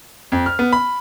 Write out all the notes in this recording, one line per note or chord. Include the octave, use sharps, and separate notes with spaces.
F2
F6
B3
B5